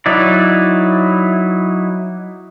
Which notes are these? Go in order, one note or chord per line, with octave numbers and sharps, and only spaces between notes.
F#3 D#4 E4 D5